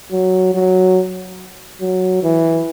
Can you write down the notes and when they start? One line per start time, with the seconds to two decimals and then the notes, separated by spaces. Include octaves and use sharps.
0.12 F#3
0.54 F#3
1.81 F#3
2.23 E3